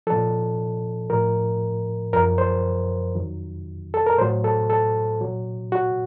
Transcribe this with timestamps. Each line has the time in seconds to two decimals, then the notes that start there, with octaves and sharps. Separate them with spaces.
0.07 F3 A4
0.12 A#2
1.10 A2 F3 A#4
2.13 F#2 F3 A#4
2.38 C5
3.15 F2 D#3 F#3
3.94 A4
4.07 A#4
4.18 A2 C5
4.21 F#3
4.44 A4
4.70 A4
5.21 A#2 F#3
5.72 F#4